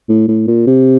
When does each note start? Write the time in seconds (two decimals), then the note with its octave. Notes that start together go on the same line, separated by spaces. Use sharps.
0.09 A2
0.28 A2
0.48 A#2
0.67 C3